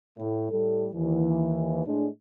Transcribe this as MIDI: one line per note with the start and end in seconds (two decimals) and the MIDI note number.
0.18 0.48 45
0.51 0.87 45
0.51 0.87 55
0.51 0.87 69
0.94 1.84 39
0.94 1.84 52
1.86 2.07 45
1.86 2.07 56
1.86 2.07 62